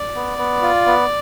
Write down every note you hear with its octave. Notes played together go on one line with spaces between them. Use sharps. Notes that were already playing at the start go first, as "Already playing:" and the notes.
Already playing: D5
B3
B3
F4
B3